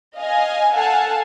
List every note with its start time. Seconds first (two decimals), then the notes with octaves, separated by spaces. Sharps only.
0.16 D#5 F5 G#5
0.74 A4 F5 F#5 G#5 A5